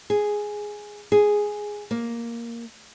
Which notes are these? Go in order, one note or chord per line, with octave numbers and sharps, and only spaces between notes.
G#4
G#4
A#3